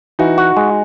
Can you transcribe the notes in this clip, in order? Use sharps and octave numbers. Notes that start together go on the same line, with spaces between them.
E3 D#4 F#4
F#4
G#3